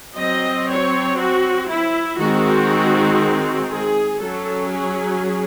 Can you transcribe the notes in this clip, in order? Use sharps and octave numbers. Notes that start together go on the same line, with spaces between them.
F#3 C4 D#5
C#5
F#4
E4
D#3 G#3 C4 F#4
G#4
F#3 C#4 A4
G#4